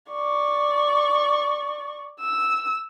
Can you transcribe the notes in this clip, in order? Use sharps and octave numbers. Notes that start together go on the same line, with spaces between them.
D5 C#6
E6